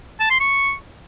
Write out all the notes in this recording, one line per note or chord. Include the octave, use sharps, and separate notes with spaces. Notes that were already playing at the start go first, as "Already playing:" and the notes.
A5
C6
C#6